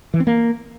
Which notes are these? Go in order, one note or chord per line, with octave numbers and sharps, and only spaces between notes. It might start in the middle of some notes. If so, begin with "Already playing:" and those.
E3
C4
A#3